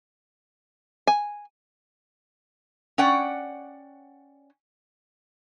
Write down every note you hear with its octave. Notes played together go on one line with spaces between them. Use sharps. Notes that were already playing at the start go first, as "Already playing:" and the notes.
G#5
C#4 D5 F#5 G5